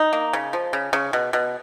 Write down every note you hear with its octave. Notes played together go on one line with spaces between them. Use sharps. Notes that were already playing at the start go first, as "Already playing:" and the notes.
Already playing: D#4
A#3
C#3
F3
C#3
C#3
B2
B2